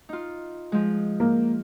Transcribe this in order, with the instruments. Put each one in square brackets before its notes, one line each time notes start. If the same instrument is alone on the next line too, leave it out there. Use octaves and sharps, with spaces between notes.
[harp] D#4 F4
F3 G#3
[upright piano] A#3